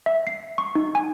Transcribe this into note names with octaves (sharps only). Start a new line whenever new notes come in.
E5
C7
C#6
D#4
G#5